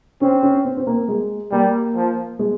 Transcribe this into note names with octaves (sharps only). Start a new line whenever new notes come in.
C4 C#4
C#4
C4
C4
A#3
G#3
G3 A#3
F3
G#3